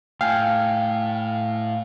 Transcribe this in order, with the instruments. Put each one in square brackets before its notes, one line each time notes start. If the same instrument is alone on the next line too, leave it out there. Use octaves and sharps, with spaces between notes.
[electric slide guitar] A2 A3 E4 [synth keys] F5 [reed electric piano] G5 G#5